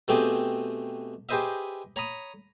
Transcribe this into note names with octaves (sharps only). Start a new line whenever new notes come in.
B2 A3 C4 G4 G#4
G4 G#4 B4 C5 D#5 E5
C#5 A#5 B5 D#6